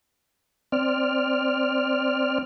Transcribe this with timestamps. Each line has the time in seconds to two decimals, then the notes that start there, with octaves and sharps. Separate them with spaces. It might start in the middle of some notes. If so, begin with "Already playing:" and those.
0.72 C4 D5 F6